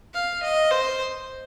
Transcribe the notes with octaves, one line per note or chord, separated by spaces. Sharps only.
F5
D#5
C5